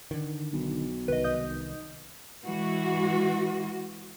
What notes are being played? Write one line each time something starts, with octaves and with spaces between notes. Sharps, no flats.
D3 D#3
B1
C2 D#3 B4 D#5
D#5 D#6 G6
E3 G#3 F#4